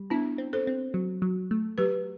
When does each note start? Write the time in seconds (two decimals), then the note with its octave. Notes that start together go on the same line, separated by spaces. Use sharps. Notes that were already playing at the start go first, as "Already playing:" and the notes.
Already playing: G3
0.10 B3 D4 E4
0.38 C4
0.53 A4 C5
0.67 C4
0.94 F#3
1.22 F#3
1.51 A3
1.78 F#3 G4 B4